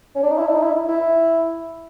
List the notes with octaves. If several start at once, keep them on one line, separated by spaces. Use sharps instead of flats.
C#4
D4
D#4
E4
D4
D#4
E4
E4